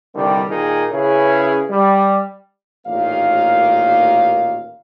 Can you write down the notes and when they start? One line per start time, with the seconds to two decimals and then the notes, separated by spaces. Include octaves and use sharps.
0.15 C2 D3 D#3 G3
0.48 A#2 D#3 D#4 G#4 A#4
0.92 C#3 C#4 E4 G#4 B4
1.70 G3
2.87 A1 D#2 A#2 D#3 A#3 F5